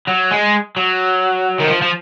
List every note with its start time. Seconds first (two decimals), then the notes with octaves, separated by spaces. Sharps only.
0.08 F#3
0.31 G#3
0.76 F#3
1.60 D#3
1.68 F3
1.82 F3